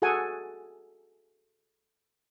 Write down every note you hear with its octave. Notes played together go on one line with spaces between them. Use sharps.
F#4 G#4 A4 F#5 G#5